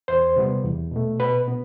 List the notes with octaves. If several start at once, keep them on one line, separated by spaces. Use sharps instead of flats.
E2 C5 C6
C3 G3 B3
E2
B2 A3
B2 B4 B5
B3